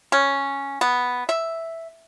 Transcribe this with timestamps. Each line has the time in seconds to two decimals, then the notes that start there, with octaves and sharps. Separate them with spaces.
0.12 C#4
0.81 B3
1.29 E5